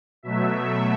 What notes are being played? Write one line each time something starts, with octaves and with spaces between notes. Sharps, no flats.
B2 F#3 A3 E5